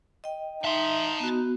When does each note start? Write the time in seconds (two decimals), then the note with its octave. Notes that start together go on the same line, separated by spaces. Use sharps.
0.24 D#5 G5
0.65 D#4 E5 A5 C6
1.20 B3 F#4